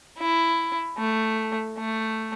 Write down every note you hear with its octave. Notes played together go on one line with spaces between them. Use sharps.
E4
A3
A3